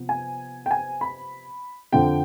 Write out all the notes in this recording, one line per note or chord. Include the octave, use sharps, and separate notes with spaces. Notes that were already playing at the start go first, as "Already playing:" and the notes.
Already playing: C3 F3 B3
G#5
G5
G#5
B5
F2 D3 F3 G5